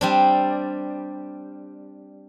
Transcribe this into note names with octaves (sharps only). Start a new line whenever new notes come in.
G3 C4 D4